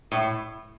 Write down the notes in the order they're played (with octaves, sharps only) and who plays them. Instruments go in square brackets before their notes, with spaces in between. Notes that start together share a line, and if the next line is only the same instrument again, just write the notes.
[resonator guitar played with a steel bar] A2